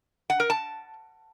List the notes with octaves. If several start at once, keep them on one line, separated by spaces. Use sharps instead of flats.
F#5
A#4
A5